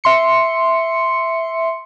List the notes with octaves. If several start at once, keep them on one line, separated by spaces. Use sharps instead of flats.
E5 C6 C#7